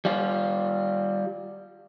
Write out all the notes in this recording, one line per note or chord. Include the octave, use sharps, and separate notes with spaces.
G3 F4